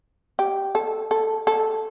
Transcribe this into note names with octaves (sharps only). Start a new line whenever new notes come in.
G4
A4
A4
A4